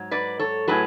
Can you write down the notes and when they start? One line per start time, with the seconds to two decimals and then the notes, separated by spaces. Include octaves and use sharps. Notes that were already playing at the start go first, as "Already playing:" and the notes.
Already playing: G#2 F#3
0.11 B4 D5
0.39 A4 C#5
0.68 A2 F#3 G#4 B4